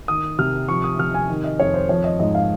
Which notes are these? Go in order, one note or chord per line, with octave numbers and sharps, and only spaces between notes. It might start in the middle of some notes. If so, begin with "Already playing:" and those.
D#3 D#6
C3 F6
F3 C#6
D#6
C3 F6
G#5
D#3
D#5
F2 C#5
C5
F3 C#5
D#5
G#2 D#5
F5